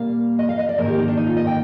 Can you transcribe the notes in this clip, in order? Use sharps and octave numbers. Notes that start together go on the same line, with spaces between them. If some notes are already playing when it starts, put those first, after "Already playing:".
Already playing: A#2 G3 A#3 F5
D#5
F5
D#5
D5
G#2 D#3 A#3 A#4
G4
D#4
D4
D#4
F4
D#5
G5